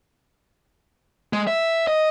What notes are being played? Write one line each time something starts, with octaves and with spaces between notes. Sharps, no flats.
G#3
E5
D#5